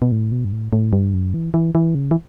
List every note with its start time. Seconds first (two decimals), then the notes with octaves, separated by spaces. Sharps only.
0.02 B2
0.12 A2
0.32 B2
0.45 G2
0.52 A2
0.73 A2
0.93 G2
1.14 F#2
1.34 E3
1.54 E3
1.75 E3
1.95 C#3
2.11 E3